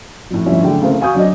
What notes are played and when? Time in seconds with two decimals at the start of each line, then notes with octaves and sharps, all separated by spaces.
0.31 F2 A2
0.46 G1 F2 A2 C#4 E5
0.63 D3 F#3 A3 D4 G#4 G5
0.80 C#3 E3 A3 A#3 C4
1.01 F5 G#5 C#6 D#6 G6
1.15 F#3 D4 D5 D#5